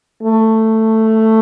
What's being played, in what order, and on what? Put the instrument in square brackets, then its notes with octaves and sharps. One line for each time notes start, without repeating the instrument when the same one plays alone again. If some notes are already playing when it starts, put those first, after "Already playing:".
[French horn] A3